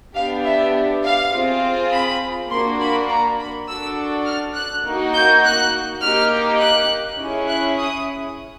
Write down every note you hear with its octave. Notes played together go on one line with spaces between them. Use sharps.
B3 D4 G4 F5
E5
F5
C4 F4 G#4
B5
A#3 D4 F#4 C6
B5
A#5
B5
D4 F#4 A4 E6
F6
F#6
A#3 D#4 F#4
G6
F#6
A#3 D#4 G4 F6
F#6
C#4 E4 G#4
F#6
D#6